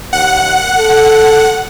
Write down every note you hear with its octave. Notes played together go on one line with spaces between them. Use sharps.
D#2 F#5
A4